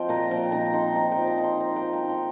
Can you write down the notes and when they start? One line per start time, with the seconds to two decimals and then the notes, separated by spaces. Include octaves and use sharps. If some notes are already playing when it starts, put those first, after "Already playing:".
Already playing: F3 C4 C5 D#5 F5 G5
0.09 A#2 A#5
0.31 F3 G5
0.52 D#4 A#5
0.67 A#5
0.73 D#4 C6
0.95 D#4 A#5
1.12 G5
1.17 F3
1.27 A#5
1.38 D#4
1.44 C6
1.60 F3 A#5
1.76 G5
1.82 F3
1.93 A#5
2.04 D#4
2.09 C6